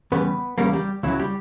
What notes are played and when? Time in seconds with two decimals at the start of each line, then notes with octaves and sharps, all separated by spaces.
0.12 E2 C#3 G3 B3 B4
0.58 E2 C#3 G3 A#3 A#4
0.73 G3 G4
1.03 C#2 C#3 E3 F#3 E4
1.19 G3 G4